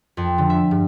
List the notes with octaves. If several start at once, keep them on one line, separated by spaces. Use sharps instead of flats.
F2
D3
E5
G2